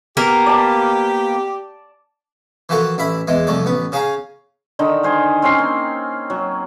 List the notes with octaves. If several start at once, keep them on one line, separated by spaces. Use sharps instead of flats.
A#3 B3 G4 A#4
D5 A5
E3 F3 F#4 A4 A#4
A1 E4 E5 B5
E2 E3 G#3
C2 F2 A3 D5
A1 B3
C#3 G#4 F5 G#5 A#5
D3 D#3 D#4
A#4 C5 G#5
C4 C#4 C6
A#3
F#3